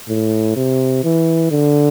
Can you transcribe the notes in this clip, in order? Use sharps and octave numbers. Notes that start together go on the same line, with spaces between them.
A2
C3
E3
D3